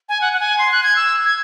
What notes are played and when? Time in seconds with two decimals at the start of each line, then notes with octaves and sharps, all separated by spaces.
0.09 G#5
0.21 F#5
0.33 F#5
0.40 G#5
0.58 C6
0.72 F#6
0.83 G#6
0.96 E6
1.25 G#6